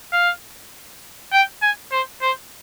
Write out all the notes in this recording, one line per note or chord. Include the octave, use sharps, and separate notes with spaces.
F5
G5
G#5
C5
C5